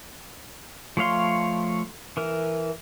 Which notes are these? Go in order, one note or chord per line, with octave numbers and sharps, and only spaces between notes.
F3 A3 C#5 F5 C6
E3 A#4